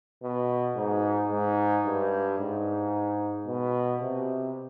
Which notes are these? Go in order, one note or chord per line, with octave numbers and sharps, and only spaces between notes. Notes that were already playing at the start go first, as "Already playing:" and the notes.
B2
G#2
G#2
G2
G#2
B2
C3